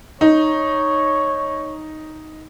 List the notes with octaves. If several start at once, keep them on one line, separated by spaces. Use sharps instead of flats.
D#4 C#5